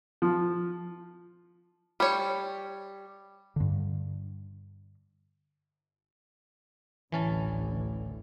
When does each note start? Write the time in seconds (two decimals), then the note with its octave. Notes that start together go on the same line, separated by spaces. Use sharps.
0.22 F3
2.00 G3 C#5
3.56 G2 D3
7.12 A1 D2 D3 E3 C#4 A5